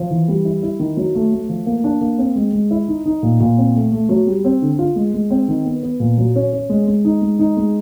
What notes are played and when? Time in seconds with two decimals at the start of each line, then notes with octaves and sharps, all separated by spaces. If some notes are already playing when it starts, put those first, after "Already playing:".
Already playing: F3
0.10 E3
0.28 G3
0.45 E4
0.63 E4
0.79 D#3
0.97 F#3
1.15 A3
1.32 A3
1.49 F3
1.66 A#3
1.84 D4
2.01 A#3
2.18 C4
2.36 G#3
2.53 G#3
2.71 E4
2.88 D#4
3.06 D#4
3.23 A#2
3.40 A#2
3.58 C4
3.75 A3
3.92 A3
4.09 F#3
4.27 G3
4.44 C4
4.62 D3
4.79 F4
4.96 G#3
5.14 G#3
5.31 C4
5.48 D#3
5.65 B3
5.83 B3
6.00 A#2
6.18 F#3
6.36 C#4
6.53 C#4
6.69 G#3
6.87 G#3
7.05 D#4
7.22 G#3
7.39 D#4
7.57 G#3